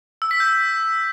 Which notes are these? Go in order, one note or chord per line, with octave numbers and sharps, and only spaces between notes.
E6
B6
G6